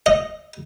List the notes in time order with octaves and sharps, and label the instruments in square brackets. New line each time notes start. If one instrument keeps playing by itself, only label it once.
[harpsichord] D#5